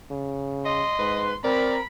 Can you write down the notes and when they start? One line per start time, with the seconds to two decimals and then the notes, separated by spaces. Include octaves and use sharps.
0.11 C#3
0.66 D#5 C6
0.99 G#2 B4
1.44 C4 A#4 D5 B5